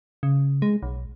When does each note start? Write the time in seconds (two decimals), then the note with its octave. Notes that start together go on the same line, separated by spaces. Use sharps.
0.23 C#3
0.62 G#3
0.83 B1